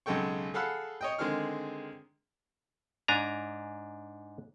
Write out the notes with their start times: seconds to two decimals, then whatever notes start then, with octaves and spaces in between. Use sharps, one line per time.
0.06 B1 C#3 G#3 A4 G5 C#6
0.54 G#4 A4 F5 F#5 B5 E6
1.01 C#5 D#5 G5
1.19 D3 D#3 G#3 C4 G#4 F6
3.08 G#2 D4 G#5 A#5